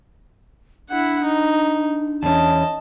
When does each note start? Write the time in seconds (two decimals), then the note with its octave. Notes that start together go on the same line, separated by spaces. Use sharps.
0.89 D4 E4 F#5
1.24 D#4
2.23 E2 C#4 D#5 A5